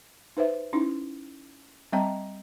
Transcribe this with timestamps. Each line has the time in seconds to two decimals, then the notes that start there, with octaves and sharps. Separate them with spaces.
0.37 D#4 B4 C5 E5
0.73 C#4 D#4 E4
1.92 G3 C4 D#5 G5 A#5